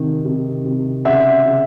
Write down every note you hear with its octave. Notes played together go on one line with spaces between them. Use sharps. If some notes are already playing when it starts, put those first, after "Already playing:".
Already playing: C3 D#3
C3
C3
C#3 E5 F#5
C#3